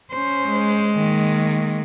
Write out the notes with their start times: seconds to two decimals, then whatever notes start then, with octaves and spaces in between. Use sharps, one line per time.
0.12 C#4 C5
0.48 G#3
0.94 D#3 A#3